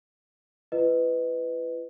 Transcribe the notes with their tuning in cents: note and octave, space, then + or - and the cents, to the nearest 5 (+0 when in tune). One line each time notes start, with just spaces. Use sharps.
E4 +45 B4 +15 D#5 +0